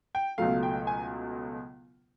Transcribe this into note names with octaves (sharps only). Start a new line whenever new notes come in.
G5
C#2 B2 F#3 A3 F5
G5
G#5